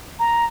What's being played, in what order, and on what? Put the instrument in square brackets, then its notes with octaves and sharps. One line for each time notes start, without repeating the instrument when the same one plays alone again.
[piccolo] A#5